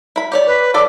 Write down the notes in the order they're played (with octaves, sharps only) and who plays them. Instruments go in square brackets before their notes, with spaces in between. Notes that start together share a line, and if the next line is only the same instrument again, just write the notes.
[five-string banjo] E4 B5
G4 C#5 D5
[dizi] B4
[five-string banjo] F#3 A4 D5 [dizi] D6